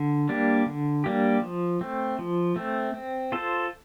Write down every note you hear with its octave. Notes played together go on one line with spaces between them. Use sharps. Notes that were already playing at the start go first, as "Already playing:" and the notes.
Already playing: D3
G3 A#3 D4 G4
D3
G3 A#3 D4 G4
F3
A3 C4
F3
A3 C4
C4
F4 A4 C5